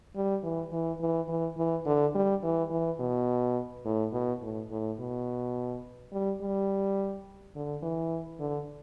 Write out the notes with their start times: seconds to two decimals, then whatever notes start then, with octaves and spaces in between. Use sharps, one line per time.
0.16 G3
0.43 E3
0.72 E3
1.01 E3
1.28 E3
1.57 E3
1.86 D3
2.15 G3
2.43 E3
2.70 E3
2.99 B2
3.85 A2
4.13 B2
4.42 A2
4.71 A2
4.99 B2
6.12 G3
6.41 G3
7.55 D3
7.83 E3
8.40 D3